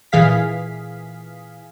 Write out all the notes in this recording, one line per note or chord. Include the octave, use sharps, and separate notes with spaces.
A#2 E3 G#4 F5 B6